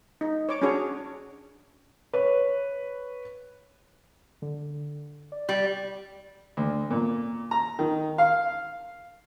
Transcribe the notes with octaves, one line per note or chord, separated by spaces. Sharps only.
D#4
C#5 D6
C#4 D4 F#4 G#4 C#5
B4 C#5
D3
D5
G3
D2
A#2
A#5
D#3
F5